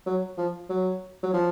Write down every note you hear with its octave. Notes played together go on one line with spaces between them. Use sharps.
F#3
F3
F#3
F#3
F3